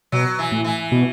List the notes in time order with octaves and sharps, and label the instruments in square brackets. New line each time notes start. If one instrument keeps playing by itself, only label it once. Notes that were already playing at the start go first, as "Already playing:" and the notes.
[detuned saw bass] B2 [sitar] F#3
[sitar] E3
[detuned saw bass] A2
[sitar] E3
[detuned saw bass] B2